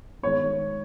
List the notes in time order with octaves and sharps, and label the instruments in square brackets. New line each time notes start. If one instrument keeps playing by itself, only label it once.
[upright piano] D#3 G#3 B3 C#5